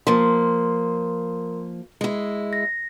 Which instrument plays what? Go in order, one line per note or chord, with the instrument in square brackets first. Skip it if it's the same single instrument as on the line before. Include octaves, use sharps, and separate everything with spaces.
[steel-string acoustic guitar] F3 A#3 [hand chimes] A#4 C6
[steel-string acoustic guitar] G#3 E4
[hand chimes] A#6